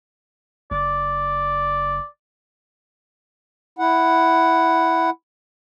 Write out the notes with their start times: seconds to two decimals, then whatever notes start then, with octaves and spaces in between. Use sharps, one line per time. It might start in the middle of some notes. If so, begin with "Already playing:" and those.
0.71 F#1 D5
3.79 E4 F#5